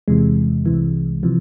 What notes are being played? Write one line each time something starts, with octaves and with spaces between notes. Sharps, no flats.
E2 C3 E3 G#3
C2 C3 E3
C3 E3 F3